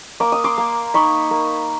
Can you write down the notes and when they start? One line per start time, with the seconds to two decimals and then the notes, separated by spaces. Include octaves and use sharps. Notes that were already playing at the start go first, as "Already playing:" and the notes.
0.20 A#3 D6
0.32 D#6
0.44 C6 D6
0.58 A#3
0.94 D#4 B5 C#6
1.31 A#3